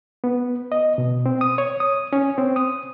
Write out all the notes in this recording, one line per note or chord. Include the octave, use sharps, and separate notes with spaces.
B3
D#5
B2
C4
D#6
C#5
D#6
C#4
C4
D#6